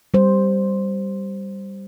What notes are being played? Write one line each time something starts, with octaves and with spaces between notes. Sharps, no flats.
G3 C5